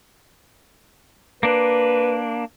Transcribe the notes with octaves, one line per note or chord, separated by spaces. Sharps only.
A#3 D4 B4